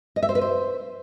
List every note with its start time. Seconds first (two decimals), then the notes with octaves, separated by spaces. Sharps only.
0.16 D#5
0.23 E5
0.29 C5
0.35 B4
0.41 C5